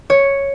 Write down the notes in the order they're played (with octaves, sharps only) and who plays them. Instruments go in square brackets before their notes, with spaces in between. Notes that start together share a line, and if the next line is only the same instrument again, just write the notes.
[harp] C#5